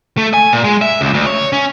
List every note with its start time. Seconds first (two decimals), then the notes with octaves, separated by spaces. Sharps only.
0.17 A3
0.34 G#5
0.53 A#2
0.64 G#3
0.81 E5
1.01 C#2
1.14 D2
1.26 C#5
1.53 C#4